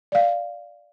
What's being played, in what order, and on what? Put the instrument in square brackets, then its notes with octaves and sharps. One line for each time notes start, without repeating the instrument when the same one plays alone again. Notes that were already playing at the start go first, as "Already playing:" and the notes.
[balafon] D5 F5